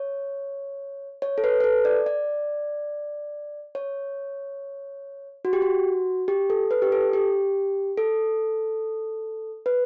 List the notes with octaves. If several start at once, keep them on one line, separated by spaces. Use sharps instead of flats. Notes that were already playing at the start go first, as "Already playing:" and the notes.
Already playing: C#5
C#5
A4
B4
B4
A4
D5
D5
C#5
F#4
G4
F#4
G4
A4
B4
G4
A4
G4
A4
B4